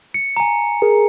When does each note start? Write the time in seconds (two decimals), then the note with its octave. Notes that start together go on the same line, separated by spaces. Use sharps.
0.14 C#7
0.37 G#5 A#5
0.82 G#4 A#4